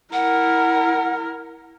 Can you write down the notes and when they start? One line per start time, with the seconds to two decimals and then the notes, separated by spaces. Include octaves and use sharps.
0.13 E4 A#4 F#5